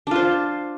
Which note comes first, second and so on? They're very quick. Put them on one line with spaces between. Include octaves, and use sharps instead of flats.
D4 F4 C5